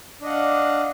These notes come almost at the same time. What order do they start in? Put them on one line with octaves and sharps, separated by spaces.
D4 D#5 F#5 F5